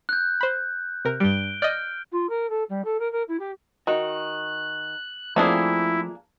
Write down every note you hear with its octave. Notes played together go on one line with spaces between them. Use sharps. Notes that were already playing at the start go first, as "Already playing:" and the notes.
F#6 G6
C5 B5
C3 A#4
G2 G3 D7 G7
D5 D#5 F6 G6
F4
A#4
A4
G3
A4
A#4
A#4
E4
G4
D#3 F#4 F#6
F3 A3 A#3 C4 D4 E4 G#4